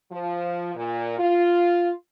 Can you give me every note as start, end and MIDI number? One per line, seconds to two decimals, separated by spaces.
0.12 0.72 53
0.75 1.18 46
1.18 1.91 65